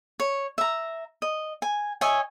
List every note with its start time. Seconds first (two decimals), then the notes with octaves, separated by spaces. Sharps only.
0.20 C#5
0.58 E5 A#5
1.22 D#5
1.62 G#5
2.01 C#5 D#5 E5 G#5